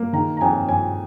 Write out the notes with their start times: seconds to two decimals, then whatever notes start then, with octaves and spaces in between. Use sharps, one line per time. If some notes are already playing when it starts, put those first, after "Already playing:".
Already playing: A#3
0.13 D#3 A#5
0.37 A#5
0.41 F2 G#5
0.69 F2 G#5